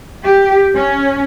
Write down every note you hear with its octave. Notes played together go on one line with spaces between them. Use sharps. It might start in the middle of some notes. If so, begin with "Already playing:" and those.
G4
C#4